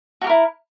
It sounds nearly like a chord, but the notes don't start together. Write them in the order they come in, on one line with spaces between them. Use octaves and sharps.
F#4 G4 A#4 E4